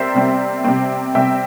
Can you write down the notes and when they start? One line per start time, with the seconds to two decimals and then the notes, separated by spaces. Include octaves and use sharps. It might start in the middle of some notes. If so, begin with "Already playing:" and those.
Already playing: C3 G3 C4 A#4 C5 D5 E5
0.15 C3 G3 C4
0.64 C3 G3 C4
1.15 C3 G3 C4 E5 G5